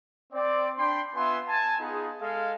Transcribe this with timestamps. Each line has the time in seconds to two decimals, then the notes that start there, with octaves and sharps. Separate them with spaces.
0.33 C4 D5
0.77 D4 G5 B5 C6
1.15 B3 F4 B4 E5 G#5 C6
1.47 G#5 A5
1.79 B3 D#4 F4 G#4
2.21 G#3 A4 D#5 F5